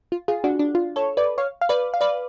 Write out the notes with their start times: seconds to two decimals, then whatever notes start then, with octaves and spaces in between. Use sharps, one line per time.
0.12 F4
0.28 F4 G#4
0.44 D4 F#4
0.59 D4
0.75 F4
0.96 A4 C#5
1.17 B4 D5
1.38 C#5 F5
1.61 F5
1.69 B4 D5
1.94 F5
2.01 B4 D5